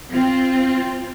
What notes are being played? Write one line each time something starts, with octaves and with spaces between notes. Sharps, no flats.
C4 F4